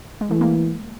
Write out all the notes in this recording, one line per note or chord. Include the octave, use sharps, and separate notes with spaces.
G#3
E3 A3
G#3 A#3